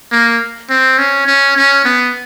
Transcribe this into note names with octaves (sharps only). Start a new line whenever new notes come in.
A#3
C4
C#4
C#4
C#4
B3